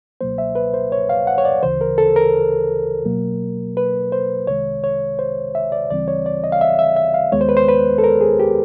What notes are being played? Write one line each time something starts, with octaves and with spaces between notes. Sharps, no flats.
C#2 B2 F#3 A#3 C5
E5
B4
C5
C#5
F5
F#5
C#5
D5
D2 C#3 E3 C5
A#4
A4
A#4
B2 F#3 A#3
B4
C5
C2 C3 D#3 G#3 C#5
C#5
C5
E5
D5
D2 C#3 E3 G3 C4 D5
C#5
D5
D#5
F5
E5
E5
E5
F5
D#2 D#3 G#3 B3 C#5
C5
B4
C5
B4
A4
A#4
G#4
G4